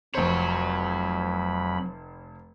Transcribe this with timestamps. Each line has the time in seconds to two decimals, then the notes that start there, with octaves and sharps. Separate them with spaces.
0.15 F1 F2 F#3 C5 C#5 B5